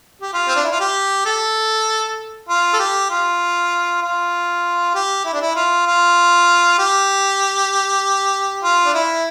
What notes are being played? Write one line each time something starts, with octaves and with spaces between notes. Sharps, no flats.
G4
F4
C4
D4
E4
F4
G4
A4
F4
A4
G4
F4
F4
G4
E4
D4
E4
F4
F4
G4
F4
D4
E4